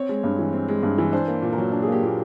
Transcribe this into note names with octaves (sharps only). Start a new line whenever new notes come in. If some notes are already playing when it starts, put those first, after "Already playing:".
Already playing: C4 C#5
G#3
G2
E3
C4
G#3
G2
E3
D4 C5
A#3
A#2
A#4
F#3
D4
A#3 G#4
G4
A#2